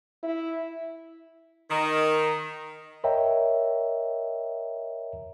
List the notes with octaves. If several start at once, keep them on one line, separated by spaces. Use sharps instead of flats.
E4
D#3
A#4 C#5 D#5 E5 G5 A#5